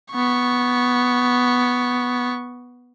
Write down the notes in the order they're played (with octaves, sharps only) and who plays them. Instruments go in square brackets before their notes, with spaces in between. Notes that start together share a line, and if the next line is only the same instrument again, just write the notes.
[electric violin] B3 C#6